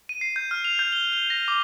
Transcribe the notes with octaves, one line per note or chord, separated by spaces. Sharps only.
D#7
C7
G6
F6
F7
G6
G7
G7
A#6
D6